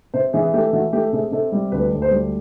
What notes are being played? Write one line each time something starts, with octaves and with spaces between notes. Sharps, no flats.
C3 C5
E3 G#4
A3 G4
E3 F#4
A3 G4
C3 G#4
C3 A4
G3
D2 B4
D2
C5
G3